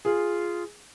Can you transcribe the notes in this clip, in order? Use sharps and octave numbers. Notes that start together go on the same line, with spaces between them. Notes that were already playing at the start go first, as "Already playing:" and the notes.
F4 G#4